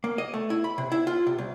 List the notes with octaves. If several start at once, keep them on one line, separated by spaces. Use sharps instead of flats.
A#3
D#5
A3
E4
B5
C3
E4
F4
C3
C2